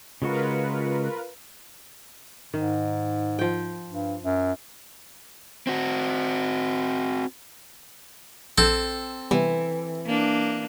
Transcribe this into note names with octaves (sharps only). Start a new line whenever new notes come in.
C#3 G#3 F4 F#4 A#4 B4
G#2 D#3
F3 G5
G2
F#2
C4 F#4
A#1 C4 A4 G6 D7
C3 E3 G3 B3
A#3 D4